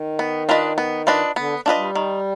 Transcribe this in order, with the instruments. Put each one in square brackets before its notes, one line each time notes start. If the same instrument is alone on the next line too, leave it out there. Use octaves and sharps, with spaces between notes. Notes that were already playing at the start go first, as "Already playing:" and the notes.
Already playing: [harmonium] D#3
[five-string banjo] B3
D4 F4 B4 D#5
B3
D4 F4 B4 D#5
[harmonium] D3 [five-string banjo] B3
[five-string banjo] D4 F4 B4 D#5
[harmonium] G3
[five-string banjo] D#3